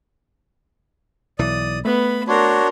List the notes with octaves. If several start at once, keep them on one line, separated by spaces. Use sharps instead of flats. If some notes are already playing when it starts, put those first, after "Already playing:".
B1 E3 D5 D#6
A3 B3 B5
D4 F#4 A#4 C#5 C6